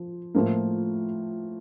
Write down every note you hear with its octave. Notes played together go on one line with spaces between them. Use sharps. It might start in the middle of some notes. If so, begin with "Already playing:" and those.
Already playing: F3
A2 F3 A#3